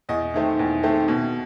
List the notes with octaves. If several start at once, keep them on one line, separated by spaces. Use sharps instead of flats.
E2 D#5
D#3 A3 C4
E2
D#3 A3 C4
B2